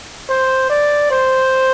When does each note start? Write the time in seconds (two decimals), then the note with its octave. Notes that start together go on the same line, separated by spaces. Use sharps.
0.29 C5
0.70 D5
1.11 C5